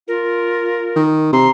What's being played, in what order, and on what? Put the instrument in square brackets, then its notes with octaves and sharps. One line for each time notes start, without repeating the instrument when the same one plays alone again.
[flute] F4 [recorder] A#4
[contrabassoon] D#3
[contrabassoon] C3 [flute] A#5 [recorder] C6